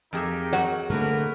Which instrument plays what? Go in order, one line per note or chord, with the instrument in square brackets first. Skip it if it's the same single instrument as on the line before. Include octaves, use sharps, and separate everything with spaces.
[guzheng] F2 G#4 E5 [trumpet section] D#4 G4 A#4
[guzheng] F#3 F#4 [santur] F#5
[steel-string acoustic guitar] D3 A3 A#3 [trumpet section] A#4 B4